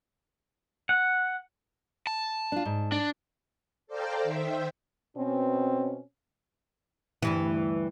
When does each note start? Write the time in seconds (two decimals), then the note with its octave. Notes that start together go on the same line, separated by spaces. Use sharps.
0.89 F#5
2.07 A5
2.52 D4 F4
2.65 G#2
2.92 D4
3.87 A4 C5 D5 F5 G5 A#5
4.23 D#3 C5 E5 G5
5.17 B2 C4 C#4
7.22 D2 G2 E3